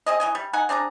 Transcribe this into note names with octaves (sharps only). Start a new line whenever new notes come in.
C4 G#4 D#5
E3 D#5 G#5
G3
D#4 F#5 G#5
C4 D4 G#4 A#5